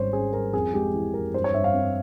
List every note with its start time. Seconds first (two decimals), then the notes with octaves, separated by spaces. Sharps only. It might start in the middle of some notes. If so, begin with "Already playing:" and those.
Already playing: G#1 G3 C#4 C5 C#5
0.13 C#4 G#4
0.33 G3 A#4
0.53 F2 G#4
0.74 G#3 G4
0.94 E3
1.14 F2 A#4
1.34 G2 C5
1.44 C#5
1.54 G2 E5
1.64 F5
1.74 C4